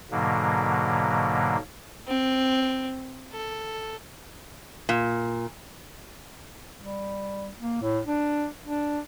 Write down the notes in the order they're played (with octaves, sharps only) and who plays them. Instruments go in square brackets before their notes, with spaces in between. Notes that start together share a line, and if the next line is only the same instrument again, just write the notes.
[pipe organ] G#2 B2 D3 F#3 A#3
[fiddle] C4
A4
[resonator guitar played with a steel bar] A#2
[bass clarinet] G3
A#3
A2
D4
D4